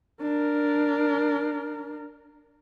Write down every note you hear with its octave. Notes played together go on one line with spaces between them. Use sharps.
D4 A#4